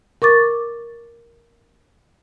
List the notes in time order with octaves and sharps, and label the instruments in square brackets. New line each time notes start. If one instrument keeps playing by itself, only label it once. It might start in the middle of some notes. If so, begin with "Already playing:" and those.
[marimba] A#4 C#6 D6 A6